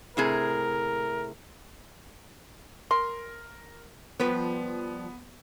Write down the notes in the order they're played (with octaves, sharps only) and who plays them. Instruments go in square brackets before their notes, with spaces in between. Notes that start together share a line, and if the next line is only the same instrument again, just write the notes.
[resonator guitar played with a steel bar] A2 C3 G#4 [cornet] A#4
[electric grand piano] A#4 [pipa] C6
[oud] F3 G3 B4 [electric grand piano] B3